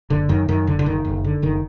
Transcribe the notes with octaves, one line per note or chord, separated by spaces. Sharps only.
F#1 D3
F#2 D#3
F#2 D#3
F#1 D3
D3
F#1 D#3
F#1
D3
F#1 D#3